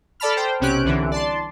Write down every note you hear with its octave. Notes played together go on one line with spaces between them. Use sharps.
A4 D5 A5 B5 F6
C5 G5
B1 C3 C#4 G4 F#6 D7
C2 D3 E3
D5 A5 C6